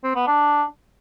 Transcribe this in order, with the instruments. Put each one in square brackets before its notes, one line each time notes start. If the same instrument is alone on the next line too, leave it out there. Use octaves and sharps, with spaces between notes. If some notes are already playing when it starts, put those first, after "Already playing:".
[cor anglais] C4
B3
D4